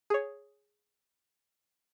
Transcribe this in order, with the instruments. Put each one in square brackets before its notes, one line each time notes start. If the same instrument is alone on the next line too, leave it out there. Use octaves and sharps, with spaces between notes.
[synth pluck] G#4 C#5